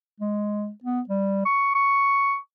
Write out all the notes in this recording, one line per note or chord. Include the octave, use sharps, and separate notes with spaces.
G#3
B3
G3
C#6
C#6